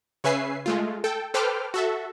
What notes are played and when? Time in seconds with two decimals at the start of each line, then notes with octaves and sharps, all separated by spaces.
0.24 C#3 C#4 B4 E5 G#5 C7
0.66 G#3 A3 F4
1.04 A4 G5
1.34 A4 B4 C5 G5 D6 F6
1.74 F#4 A4 E5